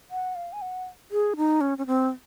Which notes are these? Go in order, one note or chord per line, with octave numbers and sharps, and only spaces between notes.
F#5
F5
G#5
F#5
G#4
D#4
C#4
C#4
C4